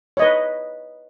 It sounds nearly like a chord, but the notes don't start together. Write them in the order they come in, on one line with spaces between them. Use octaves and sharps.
C#5 D#5 B4